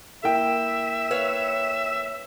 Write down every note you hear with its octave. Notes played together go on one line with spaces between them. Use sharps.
A#3 E4 E5 G5
B4 C#5 F5